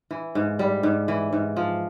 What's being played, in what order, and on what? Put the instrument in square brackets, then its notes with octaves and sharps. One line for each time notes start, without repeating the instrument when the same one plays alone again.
[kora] E3
G#2
G3
G#2
E3
G#2
F3